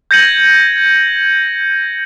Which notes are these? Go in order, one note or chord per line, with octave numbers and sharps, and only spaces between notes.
G6 G#6 A#6 C#7 D#7 F#7